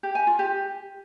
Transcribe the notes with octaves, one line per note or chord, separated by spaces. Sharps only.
G4
G#5
F4
G4